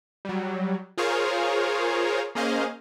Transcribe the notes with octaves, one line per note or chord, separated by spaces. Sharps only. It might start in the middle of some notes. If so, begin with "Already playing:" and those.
F#3 G3
F4 G#4 A#4 C5 C#5 F5
A#3 C#4 G#4 C5 D#5 F5